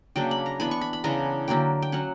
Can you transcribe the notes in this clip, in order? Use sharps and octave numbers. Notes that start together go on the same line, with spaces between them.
C#3 F#3 A#3 D4 G5
B5
A#5
E3 B3 D4 B5
C#6
B5
B5
C#3 E3 B3 D4 A#5
D3 F#3 A#3 G5
G5
F#3 C#4 F#5